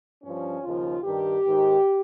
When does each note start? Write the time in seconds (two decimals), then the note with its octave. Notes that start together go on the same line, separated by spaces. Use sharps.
0.23 G2 F3 C#4
0.63 D#2 C#3 F3 F4
1.03 G2 D#3 G4
1.44 G#2 D#3